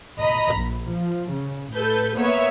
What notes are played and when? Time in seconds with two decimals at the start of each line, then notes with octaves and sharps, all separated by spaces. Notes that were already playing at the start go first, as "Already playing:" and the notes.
0.20 D#5 A#5 B5
0.55 A#1
0.90 F3
1.33 C#3
1.75 A2 A4 B4 G6
2.17 A#3 B3 C#5 E5